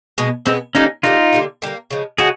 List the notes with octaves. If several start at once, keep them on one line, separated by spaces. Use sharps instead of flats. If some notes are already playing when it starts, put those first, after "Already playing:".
B2 G#3 B3
B2 G#3 B3 C4
D3 G3 A#3 C#4 D#4
D3 G3 A#3 D#4 F4
D3 G3 A#3
D3 G3 A#3
C#3 F3 G#3
C#3 F3 G#3 F#4 G#4